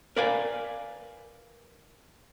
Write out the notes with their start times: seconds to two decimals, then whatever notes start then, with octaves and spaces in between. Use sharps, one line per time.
0.16 A#4 B4 D5 F5 G5 G#5